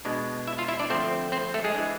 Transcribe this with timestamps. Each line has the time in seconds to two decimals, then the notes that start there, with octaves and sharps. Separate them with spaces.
0.05 B2 G#3 D4
0.47 E4 E5
0.58 F4 F5
0.68 E4 E5
0.79 D4 D5
0.89 D3 F3 A3 C4 C5
1.32 C4 C5
1.54 A3 A4
1.64 G#3 G#4
1.75 E3 G#3 D4